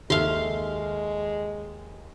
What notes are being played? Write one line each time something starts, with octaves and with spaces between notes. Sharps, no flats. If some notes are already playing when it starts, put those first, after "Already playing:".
D#2 G#3 G4 A4 E5 F5 C6 F6